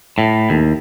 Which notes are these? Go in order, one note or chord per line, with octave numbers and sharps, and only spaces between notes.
A2
D#2